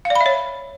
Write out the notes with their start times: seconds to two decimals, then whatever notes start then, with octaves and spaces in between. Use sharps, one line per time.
0.05 F5
0.10 D5
0.15 B5
0.21 E5
0.26 C#5